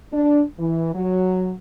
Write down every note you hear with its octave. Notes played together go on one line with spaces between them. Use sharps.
D4
E3
F#3